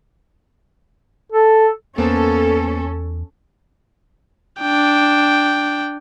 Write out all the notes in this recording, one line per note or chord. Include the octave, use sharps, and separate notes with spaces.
A4
E2 A#3 B3 C#4 A4 C5
D4 G5